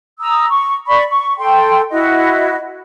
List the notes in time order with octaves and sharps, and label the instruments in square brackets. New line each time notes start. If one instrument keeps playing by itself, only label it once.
[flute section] A#5 D#6 E6
C#6
D5 B5 C#6
C#6
A4 G5 C6
E4 F#4 D#5